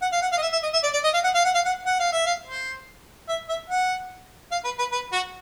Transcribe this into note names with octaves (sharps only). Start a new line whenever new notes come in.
F#5
F5
F#5
F5
D#5
E5
E5
D#5
E5
D5
D5
D#5
F5
F#5
F5
F#5
F5
F#5
F#5
F5
E5
F5
C5
E5
E5
F#5
F5
B4
B4
B4
F#4